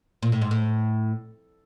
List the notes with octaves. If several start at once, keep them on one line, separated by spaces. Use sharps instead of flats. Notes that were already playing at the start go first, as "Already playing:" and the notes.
A#2
A2
G#2
A2